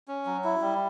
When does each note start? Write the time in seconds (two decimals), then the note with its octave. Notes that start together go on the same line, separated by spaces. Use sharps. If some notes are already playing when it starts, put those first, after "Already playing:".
0.08 C#4
0.26 F#3
0.44 E4
0.62 G3